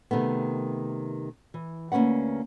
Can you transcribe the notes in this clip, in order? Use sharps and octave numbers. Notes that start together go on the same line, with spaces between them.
C3 D#3 A3 B3
E3
D2 A#3 C#4 B4 F#5